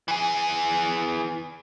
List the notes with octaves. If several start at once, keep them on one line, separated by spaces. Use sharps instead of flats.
E3 G#4